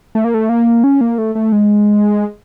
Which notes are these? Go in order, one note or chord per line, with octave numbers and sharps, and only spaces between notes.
A3
A#3
A3
A#3
C#4
A#3
A3
A3
G#3